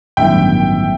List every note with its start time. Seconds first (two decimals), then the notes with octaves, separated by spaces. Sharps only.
0.17 A1 G2 D#3 F#3 B3 E5 G5